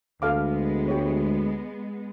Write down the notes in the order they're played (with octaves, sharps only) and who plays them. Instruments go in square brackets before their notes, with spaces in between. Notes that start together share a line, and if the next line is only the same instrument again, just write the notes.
[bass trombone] D2 [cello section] G#3 B3 [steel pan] A4 F5 D6
[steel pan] G4 C#5